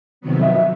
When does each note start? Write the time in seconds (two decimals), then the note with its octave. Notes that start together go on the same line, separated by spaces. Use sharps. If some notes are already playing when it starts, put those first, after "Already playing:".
0.21 F2 C3 D#3 F#3 B3
0.41 E5
0.54 E5